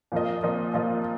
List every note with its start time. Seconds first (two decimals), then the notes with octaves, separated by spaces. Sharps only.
0.12 A#2 F3 A#3 F4 D#5
0.43 A#2 F3 A#3 F4 D#5
0.74 A#2 F3 A#3 F4 D#5